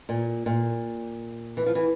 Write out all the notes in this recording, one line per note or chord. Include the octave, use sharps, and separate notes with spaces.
A#2
A#2
E3
F3
E3